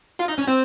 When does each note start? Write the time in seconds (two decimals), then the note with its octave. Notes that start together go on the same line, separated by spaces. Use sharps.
0.19 F4 F5
0.28 D#4 D#5
0.38 C#4 C#5
0.47 C4 C5